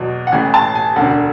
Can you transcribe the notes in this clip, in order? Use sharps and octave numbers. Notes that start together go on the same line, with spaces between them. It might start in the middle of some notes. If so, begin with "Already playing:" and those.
Already playing: E2 B2 F#3
F#5
A1 A2 E3 G#5
A5
G#5
E1 D2 D3 F#5